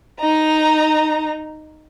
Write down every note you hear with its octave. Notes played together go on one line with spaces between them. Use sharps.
D#4 A#5